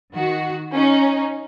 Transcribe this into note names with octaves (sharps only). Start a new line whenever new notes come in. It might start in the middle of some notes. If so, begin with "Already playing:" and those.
D#3 F#4
C#4 D#4